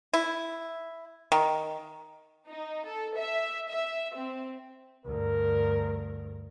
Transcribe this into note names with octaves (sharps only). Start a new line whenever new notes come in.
E4
D#3
D#4
A4
E5
E5
C4
D2 G2 A#4